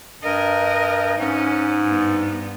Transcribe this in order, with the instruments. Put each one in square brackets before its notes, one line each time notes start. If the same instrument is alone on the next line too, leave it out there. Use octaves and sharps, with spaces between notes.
[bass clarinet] G2 [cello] A#4 D#5
[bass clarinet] G#2 [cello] C#4
[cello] G2 B3